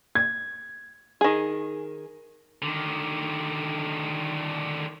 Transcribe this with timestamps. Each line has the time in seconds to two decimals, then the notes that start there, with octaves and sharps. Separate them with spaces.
0.15 G#6
1.21 D#3 G#4
2.62 D3 D#3